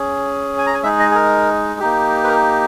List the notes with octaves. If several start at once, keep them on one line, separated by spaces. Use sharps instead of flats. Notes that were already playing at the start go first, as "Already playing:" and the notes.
Already playing: C#4 G#4
G#5
A#5
G#5
G#3 D#4 G#4 E5
D#5
G#4
A#4
A#3 D#4 G4
B4
A#4